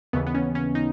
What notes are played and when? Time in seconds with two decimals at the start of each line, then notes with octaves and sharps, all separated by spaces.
0.13 D#2 C#3 E3 B3
0.27 B3
0.35 C#4
0.55 C#4
0.75 D#4